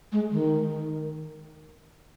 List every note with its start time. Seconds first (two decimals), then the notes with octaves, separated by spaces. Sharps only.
0.12 G#3
0.32 D#3